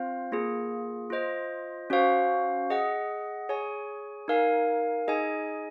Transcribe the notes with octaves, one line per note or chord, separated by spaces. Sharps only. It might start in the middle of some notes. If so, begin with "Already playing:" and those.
Already playing: C4 F4 C5 F5
A#3 F4 G#4
F4 C5 D#5
C#4 F#4 C5 F5
G#4 D#5 F#5
G#4 C#5 G#5
D#4 A#4 F5 G#5
D#4 G#4 D#5 G#5